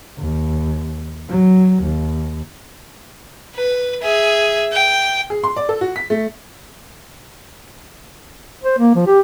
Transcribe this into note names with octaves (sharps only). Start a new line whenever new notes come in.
D#2
F#3
D#2
B4
G#4 E5
G5
G#4
C6
D5
A4
F#4
B6
A3
C5
A#3
F3
G4